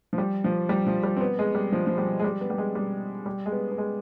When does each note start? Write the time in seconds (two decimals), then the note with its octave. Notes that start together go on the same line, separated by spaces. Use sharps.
0.13 F3
0.18 G3
0.44 F3
0.69 G3
0.87 F3
1.03 G3
1.17 C4
1.20 B3
1.39 G#3
1.55 G3
1.72 F3
1.87 F3
1.98 G3
2.20 G#3
2.24 G3
2.41 B3
2.50 G3
2.58 G#3
2.75 G3
3.26 G3
3.46 G#3
3.52 B3
3.72 B3
3.78 G#3